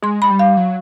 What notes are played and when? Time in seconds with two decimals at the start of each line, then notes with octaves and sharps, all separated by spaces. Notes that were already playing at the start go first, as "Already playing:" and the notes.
0.02 G#3 C6
0.22 G#3 B5
0.30 G3
0.39 F5
0.57 F#3